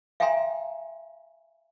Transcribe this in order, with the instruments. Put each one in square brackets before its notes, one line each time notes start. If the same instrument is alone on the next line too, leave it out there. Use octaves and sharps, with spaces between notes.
[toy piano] E5 F5 G5 G#5 A#5 C6